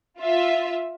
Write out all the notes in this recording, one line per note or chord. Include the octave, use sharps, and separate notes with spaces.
F4 E5